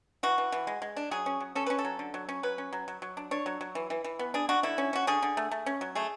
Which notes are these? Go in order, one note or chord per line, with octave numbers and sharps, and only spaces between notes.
E3 F#4
E3
E3
G#3
G#3
D4
F#3 G#4
C#4
F#3
C#4 A4
C#4 B4
A4
F#3
D3
F#3
C#4
F#3 B4
C#4
F#3
F#3
F#3
D4
D4 C#5
F#3
F#3
E3
E3
E3
B3
D4 G#4
D4 F#4
D3 E4
C#4
C#4 F#4
D3 G#4
D3
A3
A3
C#4
F#3
A3 G#4